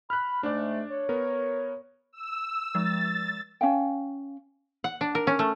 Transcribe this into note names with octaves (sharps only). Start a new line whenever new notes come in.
B5 F6 F#6
G#2 A3 D4 D5
C#5
B3 A#4
E6
F3 G#3 A6
C#4 F5 G5
F#5
D4
A#4
C#4
A3